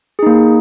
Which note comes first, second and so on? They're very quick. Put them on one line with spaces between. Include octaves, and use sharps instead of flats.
G#4 D#4 A#3